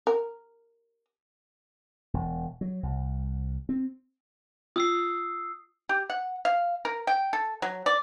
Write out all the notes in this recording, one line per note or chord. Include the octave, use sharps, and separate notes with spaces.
A#4
E1
F#3
C2
C4
F4 D#6 E6 C7
G4
F#5
F5
A#4
G5
A4
F#3
D5